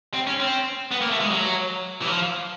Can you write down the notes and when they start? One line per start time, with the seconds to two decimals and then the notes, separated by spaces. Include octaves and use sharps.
0.14 C4
0.27 C#4
0.40 C4
0.91 B3
1.02 A#3
1.11 A3
1.21 G#3
1.31 F#3
2.02 E3
2.07 F3